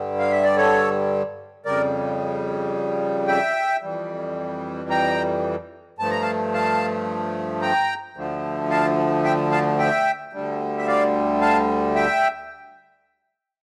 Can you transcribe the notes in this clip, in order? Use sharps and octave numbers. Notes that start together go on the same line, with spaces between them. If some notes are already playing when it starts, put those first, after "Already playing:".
Already playing: G2 D3 G3
F5
E5
D5
A4 C#5
F2 C#3 G3 A#4 D5
E5 G5
F2 E3 G3
G5 A#5
G2 F3 A3 A5
A#5
F5 A5
F5 A5
G5 A#5
D2 D3 F3 A3
F5 A5
E5 G5
F5 A5
E5 G5
D2 D3 G3
E5
D5 F5
F5 A5
E5 G5